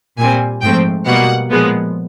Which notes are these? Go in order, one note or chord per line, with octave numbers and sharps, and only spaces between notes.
A#2 G3 C4 G#5
G#2 F3 A3 C4 G5
B2 G3 A#3 F#5
A#2 F3 G#3 B3